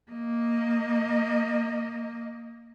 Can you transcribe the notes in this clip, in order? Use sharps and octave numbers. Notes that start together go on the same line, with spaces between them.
A#3 D#5